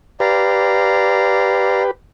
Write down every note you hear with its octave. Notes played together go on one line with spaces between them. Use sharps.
G4 B4 D5 F5 A#5